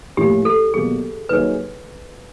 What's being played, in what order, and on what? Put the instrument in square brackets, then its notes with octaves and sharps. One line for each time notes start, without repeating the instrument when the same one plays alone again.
[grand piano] A2 F3 A#3 C#4 E4 [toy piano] G4
[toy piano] A4
[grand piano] B2 F#3 A#3 [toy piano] G#4
[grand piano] F#3 A#3 D#4 G#4 C#5 [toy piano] B4